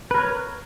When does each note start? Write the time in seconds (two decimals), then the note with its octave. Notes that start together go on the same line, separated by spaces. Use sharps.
0.11 B4
0.14 A#4
0.18 C#5